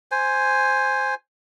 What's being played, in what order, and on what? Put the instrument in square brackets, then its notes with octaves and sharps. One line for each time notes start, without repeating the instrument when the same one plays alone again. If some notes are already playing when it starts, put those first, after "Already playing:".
[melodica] C5 G#5